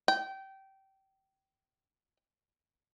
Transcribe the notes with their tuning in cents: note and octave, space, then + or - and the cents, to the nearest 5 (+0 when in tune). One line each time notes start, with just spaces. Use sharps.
G5 -20